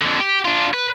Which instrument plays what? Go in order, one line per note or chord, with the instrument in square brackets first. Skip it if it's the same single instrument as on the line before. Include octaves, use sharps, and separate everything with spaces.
[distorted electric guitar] F2 D3
G4
D4 F4
B4